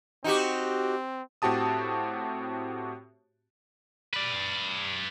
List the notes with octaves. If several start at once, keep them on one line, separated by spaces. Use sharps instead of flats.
C4 D#4 F#4 G4
A2 C4 F#4 G4 A5 D#6
B4 D5